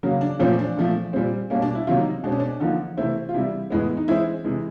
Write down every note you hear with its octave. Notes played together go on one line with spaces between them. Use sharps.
C#3 F#3 A#3
D4
A#2 F3 A3 C4 C#4
D4
A#2 F3 A3
A#2 G3 C4
B2 G3 A#3 C#4
D4
E4
C3 D#3 F#3 A#3 F4
D#4
B2 G#3 C4 D4
C#4
D4
D3 F3 A#3 D#4
C3 E3 A3 C4 E4
F4
C3 E3 G3 E4
A2 E3 G#3 B3
D#4
E3 G#3 C4 E4
C3 E3 G#3